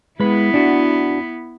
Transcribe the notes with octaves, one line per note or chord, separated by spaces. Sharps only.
G#3 B3 E4 B4
D4 F#4